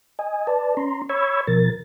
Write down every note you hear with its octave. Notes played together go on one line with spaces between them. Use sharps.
D#5 G#5
B4 D5 A5
C#4 A#5 C6
C#5 B5 C#6 E6 G#6
B2 F3 A#4 A6